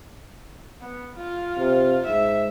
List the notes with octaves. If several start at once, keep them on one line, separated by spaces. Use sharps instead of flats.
B3
F4
C3
G#2 E5